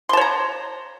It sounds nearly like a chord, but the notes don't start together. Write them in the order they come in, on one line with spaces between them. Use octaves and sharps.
C6 A5 C#5 A#5